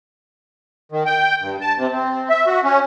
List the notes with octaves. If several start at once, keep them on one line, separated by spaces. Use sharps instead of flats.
D#3
G5
G2
A5
C3
C4
E5
F#4
C#4